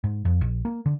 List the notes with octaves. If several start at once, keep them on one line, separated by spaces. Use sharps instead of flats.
G#2
F2
A#1
A#3
D3